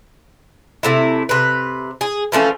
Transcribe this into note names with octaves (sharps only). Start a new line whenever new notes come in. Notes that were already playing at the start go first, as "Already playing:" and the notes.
C3 A3 E4
C3 B4
G#4
E3 F3 A3 C#4